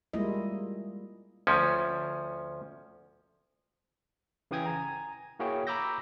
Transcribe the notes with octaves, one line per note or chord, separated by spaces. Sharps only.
G3 G#3 A#3 E4 F4 D#5
D2 F3 C#4
C#3 E3 G#4 G5 D#6 G#6
G#5 A#5
A#3 E4 F#4 G#4 C#5 G5
A#5 B5 D6 E6 G6 A#6